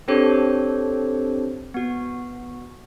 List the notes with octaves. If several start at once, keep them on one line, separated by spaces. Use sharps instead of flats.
C4 D4 G4 A4 C5 C#5
B3 F#4